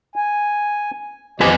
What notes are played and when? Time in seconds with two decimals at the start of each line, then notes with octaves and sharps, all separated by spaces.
0.16 G#5
1.40 F2 F3 G4 B4 D#5 G#5